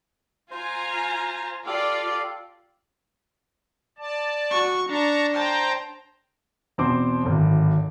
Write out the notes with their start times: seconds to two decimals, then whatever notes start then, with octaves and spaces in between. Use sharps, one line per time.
0.51 F4 C5 G#5 A#5
1.66 F4 G4 A4 D5 F5
3.98 D5 A5
4.51 F#4 C#6
4.89 D4 A5 A#5 C#6
5.34 C5 G5 A5 A#5
6.78 E2 B2 C4 C5 D6
7.23 D1 G#1